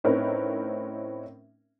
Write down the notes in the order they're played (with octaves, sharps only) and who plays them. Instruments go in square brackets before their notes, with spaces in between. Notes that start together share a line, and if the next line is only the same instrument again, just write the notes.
[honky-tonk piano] A2 C4 C#4 D#4 A#4 B4